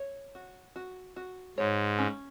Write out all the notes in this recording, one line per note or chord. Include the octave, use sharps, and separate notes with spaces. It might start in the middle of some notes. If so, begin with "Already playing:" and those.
Already playing: C#5
F#4
F#4
F#4
G#2 C#5
C#4